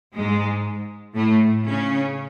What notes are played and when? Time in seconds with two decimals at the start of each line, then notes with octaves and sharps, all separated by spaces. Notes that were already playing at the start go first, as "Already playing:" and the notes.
0.14 G#2 G#3
1.16 A2 A3
1.66 C#3 C#4